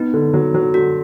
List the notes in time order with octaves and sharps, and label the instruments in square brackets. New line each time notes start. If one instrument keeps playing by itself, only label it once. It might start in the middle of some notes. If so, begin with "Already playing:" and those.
Already playing: [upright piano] B3 [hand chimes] D#4
[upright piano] D3
F#3
F#3
[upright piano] D3 [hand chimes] F#4